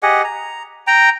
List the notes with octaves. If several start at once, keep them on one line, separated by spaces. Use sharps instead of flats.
G4 G#4 D#5 F#5
A#5
G5 A#5